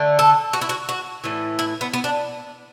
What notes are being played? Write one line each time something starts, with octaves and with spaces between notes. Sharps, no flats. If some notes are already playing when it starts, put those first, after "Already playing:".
Already playing: D3 A3
A4
F#4
E4
F#4
F#4
A2 E3 A3
E4
B3
B3
D4